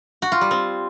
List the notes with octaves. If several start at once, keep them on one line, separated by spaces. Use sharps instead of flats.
F#4
F4
G3
C4